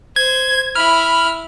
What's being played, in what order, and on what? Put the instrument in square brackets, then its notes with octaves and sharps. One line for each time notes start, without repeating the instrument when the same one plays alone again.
[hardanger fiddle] C5 [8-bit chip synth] G#6
[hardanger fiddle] E4 B5 [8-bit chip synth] F6